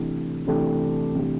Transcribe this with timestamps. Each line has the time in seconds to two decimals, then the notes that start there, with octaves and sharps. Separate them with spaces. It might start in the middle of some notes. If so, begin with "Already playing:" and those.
Already playing: C3 E3 A3 D4 G4
0.47 C3 E3 A3 D4 G4
1.15 C3 E3 A3 D4 G4